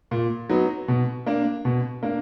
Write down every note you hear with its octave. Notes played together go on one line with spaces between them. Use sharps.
A#2
F#3 B3 D#4
B2
A#3 D4
B2
A#3 D4